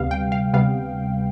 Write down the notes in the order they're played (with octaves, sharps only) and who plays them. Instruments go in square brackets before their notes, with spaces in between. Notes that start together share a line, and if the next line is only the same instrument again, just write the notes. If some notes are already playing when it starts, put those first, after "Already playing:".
Already playing: [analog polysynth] D2 C3 G3 B3 F5
G5
F5
D2 C3 G3 B3 F5